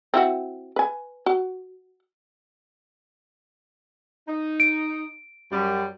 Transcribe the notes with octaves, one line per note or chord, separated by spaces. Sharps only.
C4 E4 F#4
B4 G#5
F#4
D#4
D7
F#2 G3